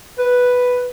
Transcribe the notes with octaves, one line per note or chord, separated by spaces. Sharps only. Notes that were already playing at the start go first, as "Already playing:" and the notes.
B4